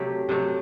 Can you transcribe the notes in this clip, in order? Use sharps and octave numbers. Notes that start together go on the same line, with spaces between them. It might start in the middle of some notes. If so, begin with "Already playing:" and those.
Already playing: C3 F#3 A3 G4
C3 F#3 A3